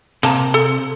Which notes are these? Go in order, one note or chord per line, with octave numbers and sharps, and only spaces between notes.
C3 A#3 A5 A#5
A4